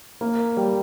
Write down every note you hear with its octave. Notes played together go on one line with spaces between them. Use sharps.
A#3
G3